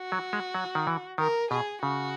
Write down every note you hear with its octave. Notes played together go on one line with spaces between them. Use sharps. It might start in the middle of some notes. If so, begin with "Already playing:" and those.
Already playing: F#4
F#3
G#3
F#3
D#3
E3
D#3 A#4
B2 G#4
C#3 F#4